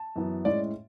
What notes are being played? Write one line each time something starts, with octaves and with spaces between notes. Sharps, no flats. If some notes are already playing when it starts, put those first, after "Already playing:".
Already playing: A5
F#2 E3 B3
A2 G#3 C#4 D5